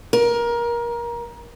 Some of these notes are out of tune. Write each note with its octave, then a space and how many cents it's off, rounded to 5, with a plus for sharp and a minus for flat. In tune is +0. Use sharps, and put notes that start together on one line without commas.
A#4 +20